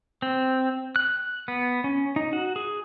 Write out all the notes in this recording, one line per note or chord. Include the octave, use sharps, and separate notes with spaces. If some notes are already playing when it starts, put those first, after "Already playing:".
C4
F#6
B3
C#4
D#4
F#4
G#4